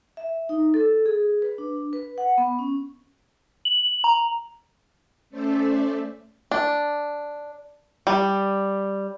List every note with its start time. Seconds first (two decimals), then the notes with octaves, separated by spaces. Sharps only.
0.17 E5
0.49 D#4
0.74 A4
1.06 G#4
1.42 B4
1.58 D4
1.93 B4
2.18 F#5
2.38 B3
2.59 C#4
3.65 F#7
4.04 A#5
5.30 A3 C#4 A4 C5 D5 E5
6.51 D4
8.07 G3